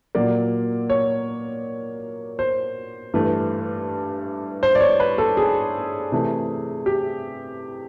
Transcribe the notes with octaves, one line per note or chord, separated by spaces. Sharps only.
A#2 F#3 A#3 D5
C#5
C5
G2 E3 A3
C5
D5
C#5
B4
A4
G#4
C3 E3 A3
G4